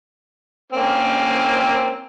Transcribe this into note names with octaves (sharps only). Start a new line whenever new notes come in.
A#3 C4 C#4